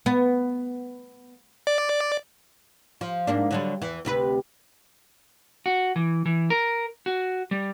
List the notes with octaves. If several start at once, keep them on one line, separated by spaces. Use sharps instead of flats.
B3
D5
F3
G#2 A#3 D4
D3 F#3 G3
E2 E3
D2 C3 B4
F#4
E3
E3
A#4
F#4
G3